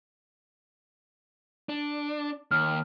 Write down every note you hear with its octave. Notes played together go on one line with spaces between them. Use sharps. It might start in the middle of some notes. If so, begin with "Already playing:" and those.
D4
D#2 F6